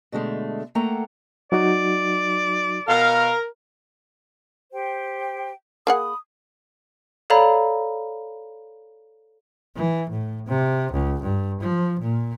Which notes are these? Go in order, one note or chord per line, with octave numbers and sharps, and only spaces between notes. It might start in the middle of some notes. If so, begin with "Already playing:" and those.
B2 D3 G#3 A3
A3 A#3 A4 F#5 G5 A#5
F#3 D#4 F#4 D5
B2 A#4 F5 A#5 F6
G4 C5 G5
A#3 G#4 F#5 B5 D#6
A4 C#5 D5 F5 A#5 B5
E3
A2
C3
C#2
G2
F3
A#2